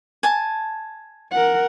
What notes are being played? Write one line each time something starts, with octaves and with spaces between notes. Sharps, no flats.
G#5 A5
A#4 F#5